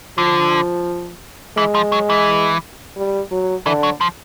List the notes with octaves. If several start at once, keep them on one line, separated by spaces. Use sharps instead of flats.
D3 F3
E3 G#3
F3
F#3
E3
G3
F#3
D3 E3
F#3
F3